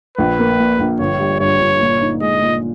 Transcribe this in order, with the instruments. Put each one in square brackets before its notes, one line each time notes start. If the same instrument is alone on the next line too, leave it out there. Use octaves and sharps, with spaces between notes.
[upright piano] A#1 [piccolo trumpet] B4
[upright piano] A#3
A#2
A#1
[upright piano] G1 [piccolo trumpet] C#5
[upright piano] G3
[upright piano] G2 [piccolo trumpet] C#5
[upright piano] G1
A#2
D#4
[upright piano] G#3 [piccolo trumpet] D#5
[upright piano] A#2